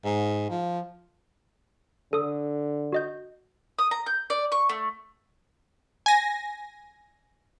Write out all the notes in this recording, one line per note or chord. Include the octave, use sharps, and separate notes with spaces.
G#2
F3
D3 A4 D#6
F#4 D#5 G6
D#6
A#5
G6
D5
C#6
A3
G#5 A#6